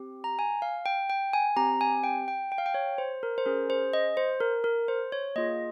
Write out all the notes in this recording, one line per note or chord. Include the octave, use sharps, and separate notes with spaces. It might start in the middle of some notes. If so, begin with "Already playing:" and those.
Already playing: C4 G4
A#5
G#5
F5
G5
G5
G#5
C4 G4 A#5
G#5
G5
G5
G5
F5
G5
C#5
C5
A#4
C5
C#4 G#4 A#4
C5
D#5
C5
A#4
A#4
C5
C#5
A#3 F4 G#4 D#5